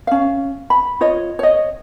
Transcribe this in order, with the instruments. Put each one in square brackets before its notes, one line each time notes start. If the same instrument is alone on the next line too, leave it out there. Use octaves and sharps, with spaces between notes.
[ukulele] C#4 F5
B5
F4 C#5 D#5
C#5 D#5